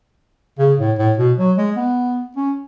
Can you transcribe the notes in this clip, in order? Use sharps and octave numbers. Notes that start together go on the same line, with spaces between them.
C#3
A2
A2
B2
F#3
G#3
B3
C#4